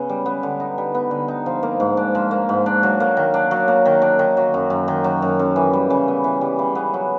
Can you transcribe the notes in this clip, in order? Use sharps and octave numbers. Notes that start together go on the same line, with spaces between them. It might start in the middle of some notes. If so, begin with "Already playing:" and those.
Already playing: C#3 B3
G3
B3
D3
D#4
G3
B3
D3
D#4
F3
A#3
G#2
D4
F3
A#3
G#2
D4
F#3
A#3
D#3
D4
F#3
A#3
D#3
D4
D#3
F#3
F#2
F#2
D#3
F#3
F#2
F#2
E3
G3
C#3
B3
E3
G3
C#3
B3
F#3